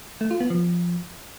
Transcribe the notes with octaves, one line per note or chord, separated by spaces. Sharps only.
A3
F4
B3
F3